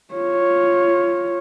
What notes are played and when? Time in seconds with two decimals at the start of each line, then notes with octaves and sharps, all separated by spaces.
0.14 F4 C#5